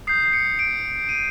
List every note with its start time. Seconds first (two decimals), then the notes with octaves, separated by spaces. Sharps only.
0.07 D#6 G6 C7
0.24 C7
0.33 C#7
0.59 D7
1.09 D#7